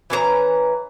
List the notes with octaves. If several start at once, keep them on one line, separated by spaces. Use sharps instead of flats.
E3 C#4 C#5 A#5